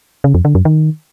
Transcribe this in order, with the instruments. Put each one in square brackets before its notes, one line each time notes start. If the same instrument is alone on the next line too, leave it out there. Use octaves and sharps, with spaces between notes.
[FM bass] C#3
F2
D3
F#2
D#3